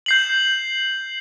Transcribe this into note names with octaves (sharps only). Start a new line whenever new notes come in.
G6 C7 F#7